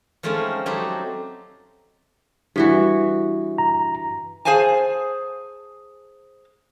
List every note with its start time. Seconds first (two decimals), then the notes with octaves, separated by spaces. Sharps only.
0.23 F3 G#3 A3 C4 C#4 D#4
0.66 F#3 C4 D#4 G4 A4
2.56 G2 E3 F#4
3.58 A#5
4.45 G#4 C5 F5 G#5 A5